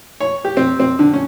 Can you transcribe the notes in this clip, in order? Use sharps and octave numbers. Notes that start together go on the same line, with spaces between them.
C#5
G4
C4
C4
D3
C#4